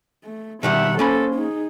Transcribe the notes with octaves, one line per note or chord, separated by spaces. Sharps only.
A3
B2 D#3 G3 E5 F#5
A#3 C#4 A4 C5 B5
D#4 G#4